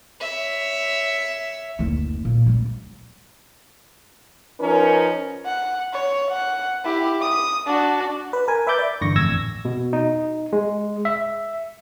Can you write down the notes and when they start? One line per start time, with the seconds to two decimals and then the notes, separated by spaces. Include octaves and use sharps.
0.21 C#5 E5
1.79 F#1 D2
2.25 A#2
2.46 D2 G3
4.60 F3 C#4 D#4 A#4 B4
5.46 F#5
5.93 C#5
6.31 F#5
6.85 E4 G4
7.22 D#6
7.66 D4 F#4
8.33 B4
8.48 A#4 G#5
8.67 B4 E5 B5 D6 G6 A6
8.79 D5
9.01 G1 E2 D3 C#6 A#6
9.16 A1 F2 E6 G#6 A#6
9.65 B2
9.93 D#4
10.53 G#3
11.05 E5